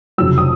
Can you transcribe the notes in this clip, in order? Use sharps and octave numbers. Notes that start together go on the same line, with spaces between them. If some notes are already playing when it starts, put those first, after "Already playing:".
F1 F2 C#3 F#3 E6
D#6